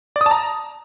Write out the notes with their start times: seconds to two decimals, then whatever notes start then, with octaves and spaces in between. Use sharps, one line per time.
0.16 D5
0.21 D#6
0.26 A5
0.31 A#5